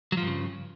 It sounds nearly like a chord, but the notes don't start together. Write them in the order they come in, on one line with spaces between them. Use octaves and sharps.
F#3 F3 G2 C#3